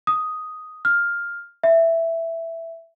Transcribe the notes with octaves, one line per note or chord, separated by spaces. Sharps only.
D#6
F6
E5